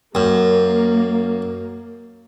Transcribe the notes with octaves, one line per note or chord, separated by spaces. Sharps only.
F#2 A#3